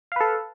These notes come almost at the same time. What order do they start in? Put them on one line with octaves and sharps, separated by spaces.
F5 B4 A4